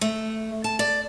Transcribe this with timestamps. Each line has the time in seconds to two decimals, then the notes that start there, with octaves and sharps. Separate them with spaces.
0.01 A3
0.64 A5
0.79 D5